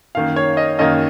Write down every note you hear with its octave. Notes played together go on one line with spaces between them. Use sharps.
F#2 D#3 A#3 F5
C#5
D#5
F#2 D#3 A#3 D#5